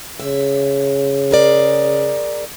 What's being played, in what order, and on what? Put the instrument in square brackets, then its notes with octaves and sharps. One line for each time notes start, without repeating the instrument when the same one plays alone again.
[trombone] C#3 [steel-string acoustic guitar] E5
[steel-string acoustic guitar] G#4 A#4 D5